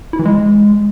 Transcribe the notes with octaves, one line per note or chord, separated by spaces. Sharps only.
E4
E3
G#3